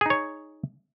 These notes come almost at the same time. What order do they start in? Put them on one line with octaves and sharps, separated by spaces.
G#4 D#4 C#5